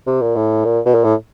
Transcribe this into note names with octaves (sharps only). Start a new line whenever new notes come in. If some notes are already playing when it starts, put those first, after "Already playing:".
C3
A#2
A2
A#2
B2
A#2
A2